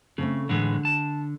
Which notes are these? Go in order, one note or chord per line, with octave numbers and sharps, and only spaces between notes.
C#3 A3 C4 A4
A2 D3 E3 G#3
A5